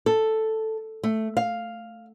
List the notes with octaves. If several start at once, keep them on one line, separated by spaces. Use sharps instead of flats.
A4
A3
F5